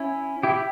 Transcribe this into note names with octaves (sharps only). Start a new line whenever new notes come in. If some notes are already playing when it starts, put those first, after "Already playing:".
Already playing: C#4 E4
E4 G4